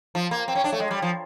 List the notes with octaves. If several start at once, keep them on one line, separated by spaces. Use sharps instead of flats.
F3
A#3
C4
C#4
D4
A3
G#3
G3
F3